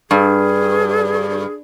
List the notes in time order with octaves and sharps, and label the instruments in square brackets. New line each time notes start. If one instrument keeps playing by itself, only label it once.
[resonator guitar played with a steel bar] G2 [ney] G#4